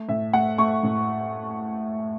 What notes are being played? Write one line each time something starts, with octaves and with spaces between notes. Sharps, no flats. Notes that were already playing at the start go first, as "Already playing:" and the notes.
Already playing: A3
A2 E5
A3 F#5
A3 C#6
A2